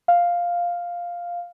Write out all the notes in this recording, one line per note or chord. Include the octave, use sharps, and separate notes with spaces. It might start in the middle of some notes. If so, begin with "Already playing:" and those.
F5